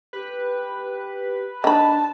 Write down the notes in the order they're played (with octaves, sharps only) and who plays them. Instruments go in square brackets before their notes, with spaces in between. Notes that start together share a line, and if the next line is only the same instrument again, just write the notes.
[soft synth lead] G4 [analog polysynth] B4
[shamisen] D#3 B5 [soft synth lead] D4 [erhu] A5